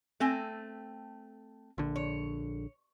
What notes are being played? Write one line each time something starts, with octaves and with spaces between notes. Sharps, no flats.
A3 C4 G#5
A#1 D3
C#5